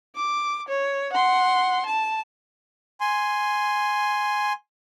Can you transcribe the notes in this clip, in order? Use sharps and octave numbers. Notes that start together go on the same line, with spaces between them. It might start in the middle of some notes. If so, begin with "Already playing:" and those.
D6
C#5
F#5 C6
A5
G#5 C6